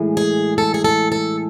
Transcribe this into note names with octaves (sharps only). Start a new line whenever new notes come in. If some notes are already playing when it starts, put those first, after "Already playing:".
Already playing: A2 E3 G#3
G#4
A4
G#4
A4
A4